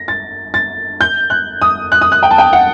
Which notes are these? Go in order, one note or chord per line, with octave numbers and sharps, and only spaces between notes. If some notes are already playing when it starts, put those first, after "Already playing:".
Already playing: A#6
A6
A6
G6
F#6
D#6
F#6
D#6
F#6
G5
A5
G5
F#5